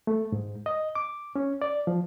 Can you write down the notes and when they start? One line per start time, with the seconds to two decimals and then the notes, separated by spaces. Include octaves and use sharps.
0.07 A3
0.32 G#2
0.66 D#5
0.95 D6
1.36 C#4
1.62 D5
1.87 F3